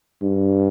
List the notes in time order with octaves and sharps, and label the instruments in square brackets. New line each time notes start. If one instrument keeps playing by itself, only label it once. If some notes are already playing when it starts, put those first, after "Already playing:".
[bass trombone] G2